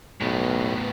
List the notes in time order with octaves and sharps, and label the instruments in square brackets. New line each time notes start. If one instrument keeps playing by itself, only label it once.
[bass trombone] B1 [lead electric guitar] A2 B3